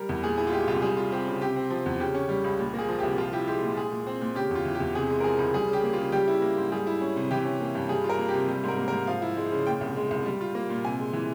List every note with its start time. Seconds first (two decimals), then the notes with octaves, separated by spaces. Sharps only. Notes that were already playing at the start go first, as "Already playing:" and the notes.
Already playing: G3 A#4
0.09 E2
0.23 A#2 G#4
0.38 E4 G#4
0.47 F4
0.53 G#3 G4
0.68 C2 F4
0.82 G3 G#4
0.97 F4
1.11 C4 G4
1.27 C#3
1.41 C3 G4
1.56 C4
1.70 F3
1.86 E2
2.00 C#3 G4
2.15 C#4
2.29 G3
2.44 C#2
2.59 A#2
2.74 A#3 G#4
2.88 F3
2.99 C2 G4
3.18 F3 F4
3.33 E4 G4
3.47 G#3 G4
3.62 A#2
3.77 G#3 G#4
3.91 A#2
4.06 C4
4.21 A#2
4.35 C#3 G4
4.51 E2 F4
4.65 E3
4.75 G4
4.80 E2
4.95 C3 G#4
5.10 G#3
5.20 A#4
5.24 F3 G#4
5.39 C#2
5.54 G3 G#4
5.68 C#3 G4
5.83 A#3
5.93 F4
5.98 C#3
6.12 G3 G4
6.28 E4
6.42 A#3
6.57 G#2
6.72 G3 G#4
6.87 E4
7.01 C#4
7.16 C3
7.31 E3 G4
7.45 C#4
7.60 A#3
7.75 G2
7.89 G3 G#4
8.04 F4
8.09 A#4
8.19 A#3
8.29 C3 G4
8.48 G3
8.64 G#2 A#4
8.78 A#3
8.88 G#2 A#4
9.07 F3 F5
9.22 E4
9.37 G#3
9.52 C#3
9.67 A#2 G5
9.81 C2
9.97 G#3
10.11 C2
10.26 G3
10.41 F4
10.55 A#3
10.69 A#2
10.85 C3 G#5
10.99 G#3
11.13 E3